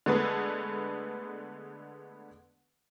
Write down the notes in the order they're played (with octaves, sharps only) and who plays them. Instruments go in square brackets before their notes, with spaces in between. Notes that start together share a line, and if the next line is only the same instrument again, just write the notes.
[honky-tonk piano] D3 G#3 A3 B3 A4 B4